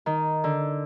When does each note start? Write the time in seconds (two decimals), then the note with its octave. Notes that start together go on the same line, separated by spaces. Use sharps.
0.06 D#3
0.44 D3